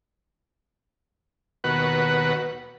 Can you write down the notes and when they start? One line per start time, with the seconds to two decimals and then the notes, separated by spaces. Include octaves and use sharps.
1.64 D#2 B2 F#4 B4 F#5